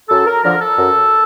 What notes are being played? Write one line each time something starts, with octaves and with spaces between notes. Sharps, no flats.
F#2 A4
A#4
D3 F3 A#4
A4
F#2